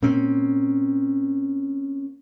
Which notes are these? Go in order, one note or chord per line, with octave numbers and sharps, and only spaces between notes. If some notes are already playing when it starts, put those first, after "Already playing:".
A#2 A#3 C4 C#4